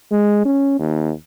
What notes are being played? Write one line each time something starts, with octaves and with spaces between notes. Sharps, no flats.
G#3
C#4
D#2